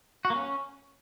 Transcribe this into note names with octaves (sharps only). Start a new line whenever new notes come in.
F#4
A#3
C#4